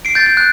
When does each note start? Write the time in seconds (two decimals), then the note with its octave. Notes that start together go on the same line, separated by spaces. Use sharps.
0.05 C7 D7
0.15 G6 A6
0.26 G6
0.37 F#6